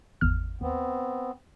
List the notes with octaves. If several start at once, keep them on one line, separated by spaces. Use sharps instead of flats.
G#1 E2 F6
D#2 B3 C4